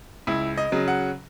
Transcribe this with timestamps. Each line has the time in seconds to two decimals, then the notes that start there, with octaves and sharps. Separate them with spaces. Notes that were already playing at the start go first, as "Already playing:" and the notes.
0.27 C#2 E4
0.58 D#5
0.72 C#3 F#3
0.88 F#5